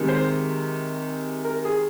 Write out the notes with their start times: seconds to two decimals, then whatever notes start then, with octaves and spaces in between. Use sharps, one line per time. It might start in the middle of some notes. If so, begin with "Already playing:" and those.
Already playing: C3 D#3 G#3
0.09 C5
1.45 A#4
1.65 G#4